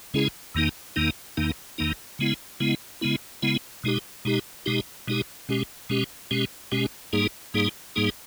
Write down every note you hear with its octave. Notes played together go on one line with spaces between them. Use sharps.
C#3 G#3 C#4 E4 G#4
E2 D#3 A#3 D#4
E2 D#3 A#3 D#4
E2 D#3 A#3 D#4
E2 D#3 A#3 D#4
C#3 G#3 B3 E4
C#3 G#3 B3 E4
C#3 G#3 B3 E4
C#3 G#3 B3 E4
B2 G#3 D#4 G4
B2 G#3 D#4 G4
B2 G#3 D#4 G4
B2 G#3 D#4 G4
B2 G#3 C#4 G4
B2 G#3 C#4 G4
B2 G#3 C#4 G4
B2 G#3 C#4 G4
G#2 G3 A#3 D#4 G#4
G#2 G3 A#3 D#4 G#4
G#2 G3 A#3 D#4 G#4